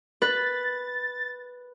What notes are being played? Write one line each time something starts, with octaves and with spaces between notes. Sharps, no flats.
B4 A6